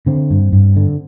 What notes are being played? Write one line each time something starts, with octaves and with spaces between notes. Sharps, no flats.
D3 C4
G2
G2
D3